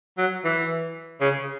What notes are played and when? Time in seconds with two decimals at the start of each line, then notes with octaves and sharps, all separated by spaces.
0.18 F#3
0.45 E3
1.21 C#3